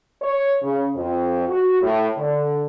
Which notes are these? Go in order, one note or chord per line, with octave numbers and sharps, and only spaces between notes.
C#5
C#3
F2
F#4
A2
D3